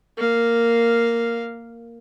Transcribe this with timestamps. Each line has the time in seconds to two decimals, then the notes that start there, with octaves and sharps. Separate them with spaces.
0.17 A#3 F5